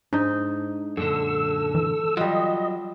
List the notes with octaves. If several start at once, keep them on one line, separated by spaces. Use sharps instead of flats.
G#2 D4 D#4
F#2 A#2 D3 A4 E6
E3
F#3 G3 F4 D#5